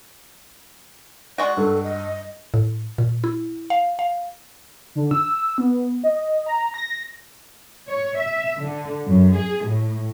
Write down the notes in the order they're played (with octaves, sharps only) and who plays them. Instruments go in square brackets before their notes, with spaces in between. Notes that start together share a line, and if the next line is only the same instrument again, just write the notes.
[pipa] G#3 F#4 [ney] D5
[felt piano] G2 [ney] A4
[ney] D#5
[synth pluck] A2
A#2
E4
F5
F5
[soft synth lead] D3
E6
B3
D#5
A#5
A#6
[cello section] C#5
E5
D3
F#2
G#4
A2